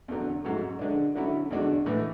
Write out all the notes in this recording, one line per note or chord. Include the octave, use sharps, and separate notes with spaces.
E2 D3 F#3
G#2 F#3 A3 C#4 F#4
D3 G#3 D4
D3 F#3 C#4 E4
E2 D3 G#3 D4 F#4
A2 E3 A3